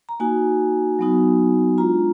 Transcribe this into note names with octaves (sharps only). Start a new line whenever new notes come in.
A#5
A#3 D#4 F#4 G#5
F#3 B3 D#4 F#4
G#3 D4 F4 A#5